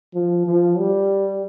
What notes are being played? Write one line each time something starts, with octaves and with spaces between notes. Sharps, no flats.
F3
F3
G3